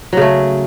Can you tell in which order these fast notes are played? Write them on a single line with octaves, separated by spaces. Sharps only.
F#3 C#3 A3